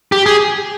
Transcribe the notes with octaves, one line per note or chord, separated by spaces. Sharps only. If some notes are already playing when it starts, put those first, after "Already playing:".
G4
G#4